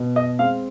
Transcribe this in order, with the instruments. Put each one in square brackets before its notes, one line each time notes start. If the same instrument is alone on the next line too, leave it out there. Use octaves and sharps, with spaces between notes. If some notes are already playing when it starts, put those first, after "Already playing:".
Already playing: [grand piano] B2
D#5
G#3 C4 F5